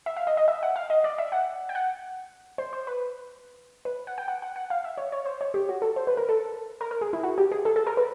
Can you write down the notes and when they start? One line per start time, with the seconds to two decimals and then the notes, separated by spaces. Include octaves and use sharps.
0.06 E5
0.16 F5
0.27 D#5
0.37 D#5
0.48 E5
0.63 F#5
0.76 F5
0.90 D#5
1.04 D5
1.18 E5
1.32 F#5
1.69 G5
1.75 F#5
2.58 C5
2.73 C5
2.87 B4
3.85 B4
4.07 F#5
4.18 G5
4.28 F#5
4.42 F#5
4.56 F#5
4.70 F5
4.84 E5
4.97 C#5
5.12 C#5
5.26 C5
5.41 C#5
5.54 G4
5.69 F#4
5.82 A4
5.96 C5
6.07 B4
6.17 A#4
6.29 A4
6.81 A#4
6.91 A#4
7.01 G#4
7.13 E4
7.23 F#4
7.38 G4
7.52 G#4
7.65 A4
7.76 A4
7.87 A#4
7.97 B4